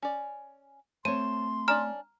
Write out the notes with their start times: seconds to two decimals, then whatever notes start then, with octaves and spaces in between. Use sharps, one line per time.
0.02 C#4 D5
1.05 A3 C4 C5 C#5 A5 C6 D#7
1.68 C#4 D4 D5 A#5 F6